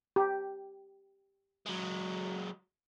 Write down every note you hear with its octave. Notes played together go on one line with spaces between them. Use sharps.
G4
F#3 G#3